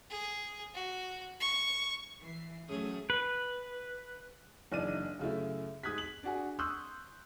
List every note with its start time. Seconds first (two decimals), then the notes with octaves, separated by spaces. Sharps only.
0.10 G#4
0.75 F#4
1.40 C#6
2.22 E3 C7
2.69 A2 F#3 A3 C#4 G#4
3.10 B4
4.72 F#1 E3 D4 D#4 D5 D#7
5.19 F#2 C#3 A3 E4
5.83 G#2 D#6 F#6 G#6 B6
5.98 F#7
6.23 D4 F#4 G#4
6.59 C6 C#6 D#6 E6 F#6 G6